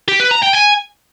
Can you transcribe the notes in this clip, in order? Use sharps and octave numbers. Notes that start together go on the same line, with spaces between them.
G4
B4
A#5
G5
G#5